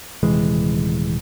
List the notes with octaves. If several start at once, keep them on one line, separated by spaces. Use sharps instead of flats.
D#1 C3 E3 G#3